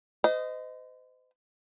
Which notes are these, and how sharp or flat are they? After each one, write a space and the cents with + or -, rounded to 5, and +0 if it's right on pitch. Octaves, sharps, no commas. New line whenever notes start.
C5 -40 D#5 +0